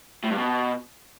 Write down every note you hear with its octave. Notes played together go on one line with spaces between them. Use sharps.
A2
G2
B2